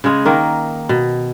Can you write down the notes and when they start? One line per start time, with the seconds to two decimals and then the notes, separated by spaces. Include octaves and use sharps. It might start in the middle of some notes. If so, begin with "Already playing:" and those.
0.04 C#3 G#3
0.25 D#3 A#3
0.89 B2